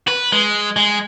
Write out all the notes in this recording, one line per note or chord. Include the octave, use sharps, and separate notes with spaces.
B4
G#3
G#3